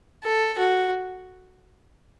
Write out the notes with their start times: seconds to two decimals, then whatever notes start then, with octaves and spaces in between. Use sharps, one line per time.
0.24 A4
0.59 F#4